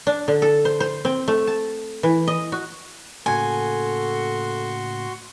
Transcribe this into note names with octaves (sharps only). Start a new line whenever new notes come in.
D4
D3
A4
C5
C5
C4
A3
A5
E3
D#5
F#4
A2 C#3 A#3 F#4 A4 G#5 C6 C#6